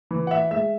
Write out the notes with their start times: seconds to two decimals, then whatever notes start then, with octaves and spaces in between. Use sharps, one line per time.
0.11 E3
0.27 F#5
0.31 E5
0.51 G#3 E5